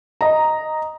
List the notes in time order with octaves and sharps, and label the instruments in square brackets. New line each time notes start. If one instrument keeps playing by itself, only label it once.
[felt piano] D#5 A#5